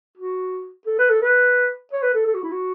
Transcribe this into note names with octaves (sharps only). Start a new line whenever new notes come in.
F#4
A4
B4
A4
B4
C#5
B4
A4
A4
F#4
E4
F#4